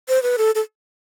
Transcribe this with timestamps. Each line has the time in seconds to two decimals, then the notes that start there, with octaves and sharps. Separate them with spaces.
0.09 C5
0.23 B4
0.38 A4
0.55 A4